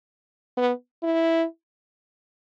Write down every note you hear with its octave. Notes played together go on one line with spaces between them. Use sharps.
B3
E4